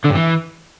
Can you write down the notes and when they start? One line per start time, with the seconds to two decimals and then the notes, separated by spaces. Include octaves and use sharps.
0.05 D3
0.10 G2
0.16 E3